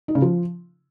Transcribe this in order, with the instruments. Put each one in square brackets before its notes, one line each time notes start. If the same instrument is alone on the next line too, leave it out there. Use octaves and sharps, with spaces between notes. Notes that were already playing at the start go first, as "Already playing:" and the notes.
[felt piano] D#4
C#3
F3